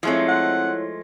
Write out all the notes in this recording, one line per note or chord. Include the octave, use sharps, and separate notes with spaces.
F3 G#3 A3 C4 D#4 E4 C#5
F#5